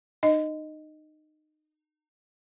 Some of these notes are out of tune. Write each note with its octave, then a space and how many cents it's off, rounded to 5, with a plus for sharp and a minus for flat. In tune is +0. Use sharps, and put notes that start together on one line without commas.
D#4 -25 D#5 +0